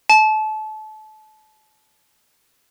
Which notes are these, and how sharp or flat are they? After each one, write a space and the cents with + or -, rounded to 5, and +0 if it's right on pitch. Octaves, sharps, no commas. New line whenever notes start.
A5 -30